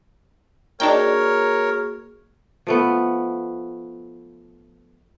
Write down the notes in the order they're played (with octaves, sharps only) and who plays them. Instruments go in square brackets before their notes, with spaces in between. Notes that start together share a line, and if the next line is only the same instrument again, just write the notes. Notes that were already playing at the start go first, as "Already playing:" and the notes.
[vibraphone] A#3 F#4 G#4 [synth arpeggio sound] D4 D#4 G5 [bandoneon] A#4 C#5
[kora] F3 A3 B3